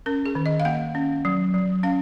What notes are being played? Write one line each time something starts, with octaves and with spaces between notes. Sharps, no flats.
C#4 A#4
G#4
D#3
D#5
F5
A#3 F#5
C#4
F#3
F#3
C#4 F5